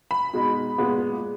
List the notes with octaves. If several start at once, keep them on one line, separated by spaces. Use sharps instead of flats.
B5
B2 G#3 D#4
A#2 G#3 B3